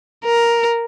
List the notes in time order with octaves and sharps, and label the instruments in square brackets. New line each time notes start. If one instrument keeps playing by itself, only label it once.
[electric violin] A#4